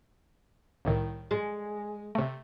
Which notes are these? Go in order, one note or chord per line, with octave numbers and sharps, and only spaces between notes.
C2 A2 D#3
G#3
C3 A3